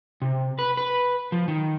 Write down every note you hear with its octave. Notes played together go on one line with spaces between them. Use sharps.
C3
B4
B4
F3
D#3